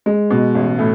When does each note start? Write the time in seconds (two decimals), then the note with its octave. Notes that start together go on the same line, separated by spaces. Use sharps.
0.06 G#3
0.31 B2
0.55 A1
0.79 A2